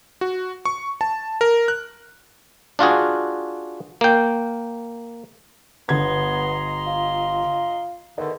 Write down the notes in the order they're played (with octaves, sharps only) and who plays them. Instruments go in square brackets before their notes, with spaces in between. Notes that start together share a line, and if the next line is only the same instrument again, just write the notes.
[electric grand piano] F#4
C#6
A5
A#4
F#6
[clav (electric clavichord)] D4 F4 F#4 G#4
A#3 G5
[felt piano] G1 G#6 [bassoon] B3 [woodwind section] D#5 A#5 C6
[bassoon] F4
[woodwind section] E2 D3 [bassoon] D#3 [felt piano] D#5